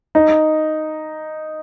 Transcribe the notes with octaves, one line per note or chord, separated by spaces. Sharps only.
D#4